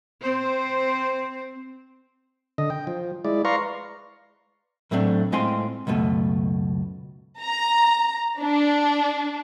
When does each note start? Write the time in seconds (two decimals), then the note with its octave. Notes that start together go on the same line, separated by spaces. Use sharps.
0.22 C4 C5
2.58 D3 D#5
2.70 G5
2.87 F3
3.25 G#3 E4 D5
3.45 B4 D5 F5 A#5 C6 C#6
4.91 A2 F#3 A3 C4 D4
5.32 A2 G#3 C4 F4 G#5 C6
5.87 C#2 F#2 B2 A3
7.41 A#5
8.40 D4